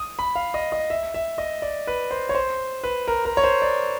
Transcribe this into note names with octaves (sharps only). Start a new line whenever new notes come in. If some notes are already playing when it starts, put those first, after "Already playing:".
Already playing: D#6
B5
F5
D#5
D#5
E5
E5
D#5
D5
B4
C5
C#5
C5
B4
A#4
A#4
C#5
C5
D5